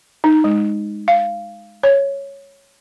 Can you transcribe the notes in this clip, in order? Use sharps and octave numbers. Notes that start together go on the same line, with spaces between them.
D#4
G#3
F5
C#5